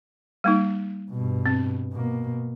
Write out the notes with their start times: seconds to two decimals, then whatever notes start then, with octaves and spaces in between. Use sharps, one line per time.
0.44 G3 A#3 D#4
1.11 G2 B2
1.46 C4
1.93 B2 A#3